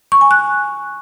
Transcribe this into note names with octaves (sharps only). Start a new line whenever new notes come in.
C#6
G#5
F#6